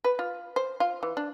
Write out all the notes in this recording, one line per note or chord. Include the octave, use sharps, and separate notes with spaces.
B4
F4
C5
F4
E3
D4